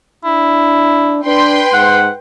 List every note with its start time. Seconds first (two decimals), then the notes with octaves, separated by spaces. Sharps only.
0.24 D4 E4
1.25 D4 B4 G5 C6
1.73 G#2 F#5